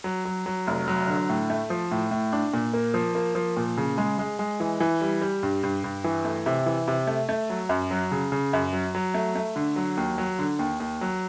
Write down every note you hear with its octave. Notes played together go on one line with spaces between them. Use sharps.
F#3
F#3
F#3
F1
F#3
D3
A2
A3
F3
A2
A2
D4
A#2
A#3
F3
A#3
F3
A#2
C#3
G#3
G#3
G#3
E3
E3
G3
G3
G2
G2
G2
E3
A3
C3
E3
C3
A3
A3
F#3
F#2
F#3
C#3
C#3
F#2
F#3
F#3
A3
A3
D3
F#3
D#2
F#3
D3
D#2
D#2
F#3